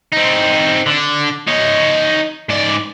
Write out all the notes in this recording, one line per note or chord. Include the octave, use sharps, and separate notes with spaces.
C4 D#4
D3 D4
D#4 C#5
G#2 D5